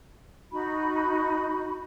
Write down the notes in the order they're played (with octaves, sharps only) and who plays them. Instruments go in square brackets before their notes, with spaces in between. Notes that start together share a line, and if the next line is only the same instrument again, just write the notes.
[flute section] D#4 F#4 B5